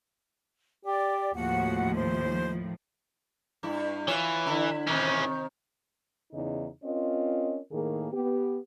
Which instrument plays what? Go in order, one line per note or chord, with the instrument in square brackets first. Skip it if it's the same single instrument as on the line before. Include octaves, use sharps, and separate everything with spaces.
[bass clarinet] G4 [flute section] D5
[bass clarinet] D#2 [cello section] A2 D#3 F3 [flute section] F#4 F#5
[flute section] C5
[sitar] G2 E4
[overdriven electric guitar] E3 [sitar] F4 C#5
[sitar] D3 E4
[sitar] C3 D#3 [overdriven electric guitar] E3 C#4
[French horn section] E2 C#3 D#4
C4 C#4 F4 A#4 D#5
A2 D#3 A#3 G#4
B3 G4